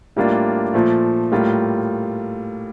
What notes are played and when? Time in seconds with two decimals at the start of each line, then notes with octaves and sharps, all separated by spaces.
0.16 A2 G3 A#3 D4 F4
0.74 A#2 F3 A3
1.32 A2 G3 A#3 F4